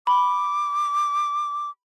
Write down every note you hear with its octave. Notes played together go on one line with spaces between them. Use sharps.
B5 D6